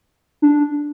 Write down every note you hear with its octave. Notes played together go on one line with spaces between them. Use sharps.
D4